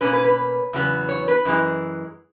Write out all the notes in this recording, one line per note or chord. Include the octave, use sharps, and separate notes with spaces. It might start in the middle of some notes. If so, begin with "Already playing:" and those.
B2 A#3 C#4 B4
B4
B4
E2 C#3 F#3 B3
C#5
B4
F#2 E3 G#3